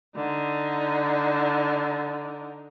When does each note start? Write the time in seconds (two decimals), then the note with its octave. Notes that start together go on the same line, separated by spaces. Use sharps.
0.16 D3 D#4